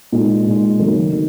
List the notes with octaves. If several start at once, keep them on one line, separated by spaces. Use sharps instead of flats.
A#2 G#3 D#4
A#2 G#3 D#4
F#1 F#2 D#3 A#3
D#3 A#3